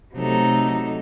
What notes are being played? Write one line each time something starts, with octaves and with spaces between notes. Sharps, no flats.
C3 F#3 A3 D#4 A4